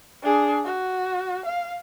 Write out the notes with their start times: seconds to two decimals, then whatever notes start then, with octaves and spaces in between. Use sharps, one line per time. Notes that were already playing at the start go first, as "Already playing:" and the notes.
0.23 D4 G#4
0.65 F#4
1.46 F5